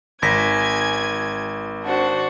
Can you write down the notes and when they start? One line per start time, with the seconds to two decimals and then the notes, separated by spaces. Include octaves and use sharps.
0.22 G#1 G#5 G#6 A#6 B6
1.84 D4 F#4 C5